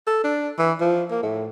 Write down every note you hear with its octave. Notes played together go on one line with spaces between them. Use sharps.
A4
D4
E3
F3
A#3
A2